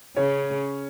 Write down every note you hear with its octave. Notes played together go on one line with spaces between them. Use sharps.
C#3 C#4 C#5